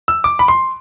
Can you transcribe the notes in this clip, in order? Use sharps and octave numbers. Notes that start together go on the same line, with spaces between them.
E6
D6
B5
C6